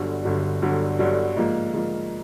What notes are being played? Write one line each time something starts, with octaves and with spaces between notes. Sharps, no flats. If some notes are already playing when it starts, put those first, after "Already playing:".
Already playing: G1 G2 D3 F#3
G1 G2 D3 F#3
G1 G2 D3 F#3
G1 G2 D3 F#3
G#2 F3 A#3
G#2 F3 A#3